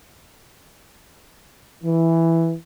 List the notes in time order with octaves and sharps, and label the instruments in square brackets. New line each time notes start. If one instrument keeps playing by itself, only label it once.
[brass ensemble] E3